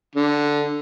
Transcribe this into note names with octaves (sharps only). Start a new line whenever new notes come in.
D3